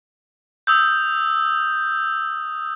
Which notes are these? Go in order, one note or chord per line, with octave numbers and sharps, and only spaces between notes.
D#6 E6 G6